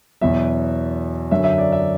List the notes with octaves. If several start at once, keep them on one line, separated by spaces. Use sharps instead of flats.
E2 B2 F#3 E5
F#2 D3 F#3 E5
E5
D5
E5